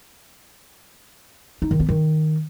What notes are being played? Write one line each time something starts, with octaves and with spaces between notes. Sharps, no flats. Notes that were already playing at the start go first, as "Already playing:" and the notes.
D#4
D#3
B3
D#3